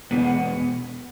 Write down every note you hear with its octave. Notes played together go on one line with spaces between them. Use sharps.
E2 B2 G#3 B3
F#5